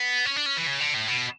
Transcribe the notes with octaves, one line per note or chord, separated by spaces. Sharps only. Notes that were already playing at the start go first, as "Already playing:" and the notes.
Already playing: B3
C#4
D4
C#4
E3
C#3
D3
A2
B2